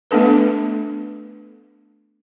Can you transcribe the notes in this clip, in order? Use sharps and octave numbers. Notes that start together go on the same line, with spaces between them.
A3 B3 D4 A4 B4